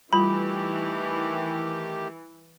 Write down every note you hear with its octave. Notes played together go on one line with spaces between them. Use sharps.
D#3 E3 G3 A3 F4 G4 B5